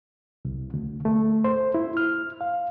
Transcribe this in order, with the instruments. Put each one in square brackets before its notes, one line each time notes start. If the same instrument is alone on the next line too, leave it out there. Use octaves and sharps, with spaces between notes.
[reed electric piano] C2
D2
A3
C5
E4
F6
F5